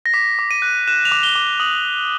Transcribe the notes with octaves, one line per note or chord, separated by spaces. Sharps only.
A#6
D6 B6
D6
D#7
F#6
F#6 E7
F7
D6
G7
D6
G7
D#6 F#7